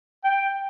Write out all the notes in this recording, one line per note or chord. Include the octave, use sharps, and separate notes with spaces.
G5